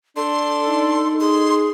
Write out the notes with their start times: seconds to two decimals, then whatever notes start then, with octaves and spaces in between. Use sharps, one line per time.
0.16 D4 A4 C6
0.67 D#4
1.20 G#4 C6